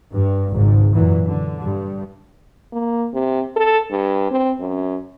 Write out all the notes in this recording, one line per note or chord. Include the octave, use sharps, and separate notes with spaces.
G2
G#1 C#2 G#2
F#2 A#2 E3 F#3
D3
G2
A#3
C3
A4
G2
C4
F#2